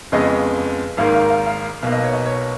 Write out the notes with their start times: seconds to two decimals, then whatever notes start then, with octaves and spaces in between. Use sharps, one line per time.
0.12 F2 C#3 G#3 B3 D#5
0.97 G#1 G#2 D#3 A#3 F5
1.14 F5
1.30 F5
1.46 F5
1.82 B1 B2 A#3 F5
1.92 D#5
2.03 C#5
2.13 D#5
2.25 C#5